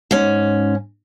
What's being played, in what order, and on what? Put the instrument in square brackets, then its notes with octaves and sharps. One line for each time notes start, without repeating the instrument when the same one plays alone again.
[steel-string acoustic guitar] G#2 C#4